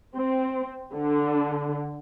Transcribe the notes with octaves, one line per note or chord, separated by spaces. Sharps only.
C4
D3